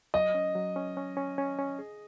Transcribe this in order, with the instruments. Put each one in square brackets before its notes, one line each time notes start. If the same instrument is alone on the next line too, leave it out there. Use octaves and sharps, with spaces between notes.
[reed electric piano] F#3 [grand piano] D#5
[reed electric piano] C#4
F#3
C#4
C#4
C#4
C#4
C#4
G#4